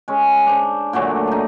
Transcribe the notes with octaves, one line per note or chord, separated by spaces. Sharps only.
G#3 C#4
D4 C5
A#2 D3 F#3 A3
D4 D#4